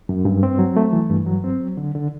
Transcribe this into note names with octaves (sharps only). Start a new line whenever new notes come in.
F#2
G2
C4
F#3
A3
E3
G2
F#3
C4
F#3
D3
D3